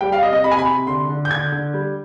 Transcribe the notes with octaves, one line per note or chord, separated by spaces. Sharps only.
G3 G5
F5
C3 D#5
D#5
C3 B5
G#5
B5
C3
D3 C6
D3
G6
D3 G#6
D3
G3